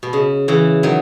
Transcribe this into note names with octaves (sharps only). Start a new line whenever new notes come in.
B2
C#3
C#3 E3
D#3 F#3